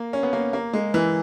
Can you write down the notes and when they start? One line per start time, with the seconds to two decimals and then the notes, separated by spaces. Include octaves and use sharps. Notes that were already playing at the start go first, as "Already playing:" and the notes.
Already playing: A#3
0.13 C#4
0.23 B3
0.33 A#3
0.53 A#3
0.73 G#3
0.94 E3